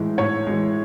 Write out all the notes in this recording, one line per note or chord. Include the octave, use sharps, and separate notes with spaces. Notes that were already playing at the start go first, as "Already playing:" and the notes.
Already playing: A2 E3 G#3
A2 C#5
E3 G#3